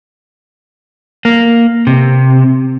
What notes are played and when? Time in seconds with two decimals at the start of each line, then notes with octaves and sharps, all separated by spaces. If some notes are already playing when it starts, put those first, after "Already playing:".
1.25 A#3
1.87 C3